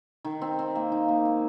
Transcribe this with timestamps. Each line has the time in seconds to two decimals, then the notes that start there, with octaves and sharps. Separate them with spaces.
0.25 D#3
0.42 C4
0.59 C4
0.75 A#3
0.92 D#4
1.08 A#3
1.25 G#3